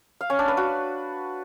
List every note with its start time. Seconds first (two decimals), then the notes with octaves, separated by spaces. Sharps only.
0.21 F5
0.30 C#4
0.39 D4
0.48 B4
0.57 F#4